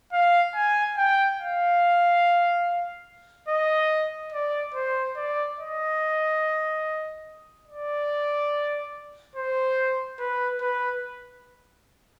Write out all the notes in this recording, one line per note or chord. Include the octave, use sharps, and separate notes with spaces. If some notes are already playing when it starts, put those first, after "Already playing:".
F5
G#5
G5
F5
D#5
D5
C5
D5
D#5
D5
C5
B4
B4